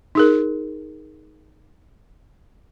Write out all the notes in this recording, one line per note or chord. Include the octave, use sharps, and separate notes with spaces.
D#4 G#4 A#4